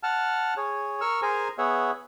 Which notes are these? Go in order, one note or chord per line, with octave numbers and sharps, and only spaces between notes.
F#5 A5 F6
G#4 C#5
A#4 C#6 E6 F6
G#4 A#4 C5 G#5 A#5
B3 G#4 C#5 E5 F#5